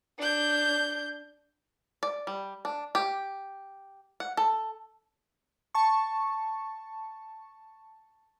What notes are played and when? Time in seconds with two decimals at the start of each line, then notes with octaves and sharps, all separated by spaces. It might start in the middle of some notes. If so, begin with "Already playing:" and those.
0.18 D4 G6
2.03 D5
2.27 G3
2.65 D4
2.95 G4
4.20 F#5
4.37 A4
5.75 A5 C#6